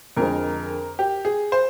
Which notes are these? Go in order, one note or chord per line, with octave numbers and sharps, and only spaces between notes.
F2 D3 G#3 A#4
G4
G#4
C5